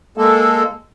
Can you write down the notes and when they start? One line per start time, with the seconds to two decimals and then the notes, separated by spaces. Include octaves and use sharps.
0.18 G#3 A#3 A4